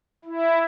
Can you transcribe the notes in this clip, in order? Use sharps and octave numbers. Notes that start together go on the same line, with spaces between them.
E4